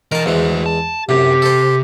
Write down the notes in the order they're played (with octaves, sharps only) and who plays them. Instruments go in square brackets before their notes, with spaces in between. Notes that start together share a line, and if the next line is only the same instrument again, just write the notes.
[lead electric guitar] E3 D#5 [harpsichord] A#4 A5
[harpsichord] E2 E3 G#3 [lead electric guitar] F#4 C5
[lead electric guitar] A5
[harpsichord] F#2 A2 [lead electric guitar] C3 [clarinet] G4
[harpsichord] A4 C5